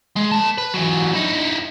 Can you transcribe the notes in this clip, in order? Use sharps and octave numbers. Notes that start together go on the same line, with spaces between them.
G#3
A#3 A5
B4
E3 F#3
D#4 E4